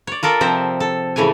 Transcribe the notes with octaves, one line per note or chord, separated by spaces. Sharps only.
C#5 D5
F4 A4 A#4 D5
C3 F3 C4 C5 E5
A4
A2 C#3 E3 A3 C#5 G#5